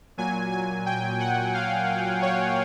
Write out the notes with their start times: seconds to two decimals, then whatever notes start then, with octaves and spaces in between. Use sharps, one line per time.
0.18 A#2 F#3 G#5
0.51 G#5
0.86 G5
1.20 F#5
1.54 F5
2.22 C#5